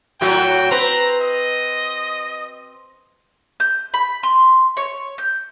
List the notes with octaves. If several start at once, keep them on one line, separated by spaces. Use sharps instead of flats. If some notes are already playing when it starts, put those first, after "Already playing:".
A2 F#3 F#4 G5
C4 B4 A#5
D#5
G6
B5
C6
C#5
G6